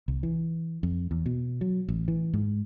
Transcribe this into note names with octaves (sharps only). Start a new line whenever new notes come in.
C2
E3
F2
E2
B2
F#3
A1
E3
G#2